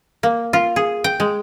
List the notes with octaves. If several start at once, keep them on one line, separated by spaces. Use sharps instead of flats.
A#3
F4
G#4
G5
G#3